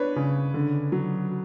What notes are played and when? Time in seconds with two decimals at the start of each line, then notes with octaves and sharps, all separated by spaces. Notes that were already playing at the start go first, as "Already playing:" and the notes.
Already playing: B3 D4 B4 C#5
0.16 C#3
0.54 D3
0.92 F#3